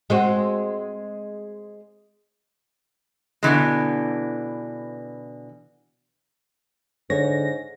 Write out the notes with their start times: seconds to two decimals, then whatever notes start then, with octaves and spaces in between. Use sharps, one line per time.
0.10 G#3 C4 F#4
3.43 B2 D3 E3 G#3
7.10 G#2 D3 C#5 A#6